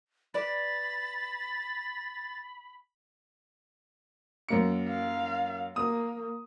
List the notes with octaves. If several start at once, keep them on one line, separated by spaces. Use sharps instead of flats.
B4 D5 B5 A6
F#2 A#3 C#7
F5
A#3 D#6